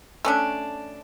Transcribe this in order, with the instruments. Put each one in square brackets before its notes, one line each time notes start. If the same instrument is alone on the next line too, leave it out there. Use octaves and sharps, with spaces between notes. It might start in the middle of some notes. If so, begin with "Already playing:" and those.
[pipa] A3 C#4 D4